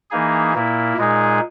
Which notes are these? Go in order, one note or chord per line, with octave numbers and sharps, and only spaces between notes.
E3 A#3 D#4 G#4
A#2 A#3 E4
A#2 G#3 D#4 G#4